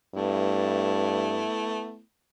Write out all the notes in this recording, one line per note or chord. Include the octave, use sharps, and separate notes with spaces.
G2 A3 B3 E4